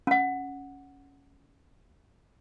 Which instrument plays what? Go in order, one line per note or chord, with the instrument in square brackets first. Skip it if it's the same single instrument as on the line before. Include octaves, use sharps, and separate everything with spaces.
[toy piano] C#4 F#5